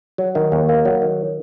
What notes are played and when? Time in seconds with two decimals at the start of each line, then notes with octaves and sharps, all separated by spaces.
0.18 F#3
0.35 D#3
0.52 D#2
0.69 A#3
0.85 F#3
1.02 D#3